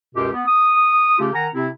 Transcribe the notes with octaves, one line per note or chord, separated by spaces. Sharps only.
C#2 F#2 B2 F4 G4
B3
D#6
C#3 A3 C#4 F4 G4
D#3 A#4 F#5 G#5 A#5
C3 C4 E4